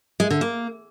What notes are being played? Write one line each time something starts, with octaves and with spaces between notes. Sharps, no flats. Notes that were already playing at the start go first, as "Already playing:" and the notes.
G#3
D3
A#3